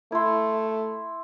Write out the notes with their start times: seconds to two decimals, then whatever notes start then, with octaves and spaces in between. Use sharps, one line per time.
0.12 A3 E4 C6